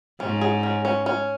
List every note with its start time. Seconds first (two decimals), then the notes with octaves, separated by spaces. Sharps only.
0.20 G#2 C#4
0.41 G#4
0.63 C#4
0.85 C#4
1.06 C#4